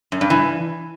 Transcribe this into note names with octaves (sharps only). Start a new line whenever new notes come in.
F#2
G2
E3